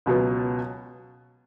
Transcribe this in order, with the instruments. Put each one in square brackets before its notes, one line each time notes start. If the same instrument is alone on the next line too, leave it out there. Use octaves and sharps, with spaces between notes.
[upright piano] C#2 B2 F#3 B3